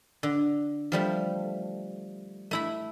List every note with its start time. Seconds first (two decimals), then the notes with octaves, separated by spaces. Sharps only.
0.23 D3
0.92 F3 G3 A3
2.51 A3 E4 B5